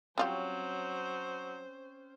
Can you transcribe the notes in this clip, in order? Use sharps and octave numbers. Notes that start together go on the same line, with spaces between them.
F#3 G3 C4 C#4 F4 G4 C5